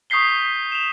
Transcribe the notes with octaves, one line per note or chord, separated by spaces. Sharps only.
C#6 D#6 G6 B6 C7 G7
E7 F7